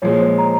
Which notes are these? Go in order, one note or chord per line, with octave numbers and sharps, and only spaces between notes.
A#2 F3 G#3 C#5
C5
A#5